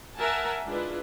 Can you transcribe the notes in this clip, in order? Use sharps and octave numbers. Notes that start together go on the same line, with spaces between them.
A#4 E5 F#5 G#5 A5
G#3 D4 E4 F4 B4